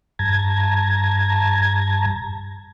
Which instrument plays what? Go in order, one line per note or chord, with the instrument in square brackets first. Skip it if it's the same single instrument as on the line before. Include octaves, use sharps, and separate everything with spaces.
[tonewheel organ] G2 A5 A#5 G#6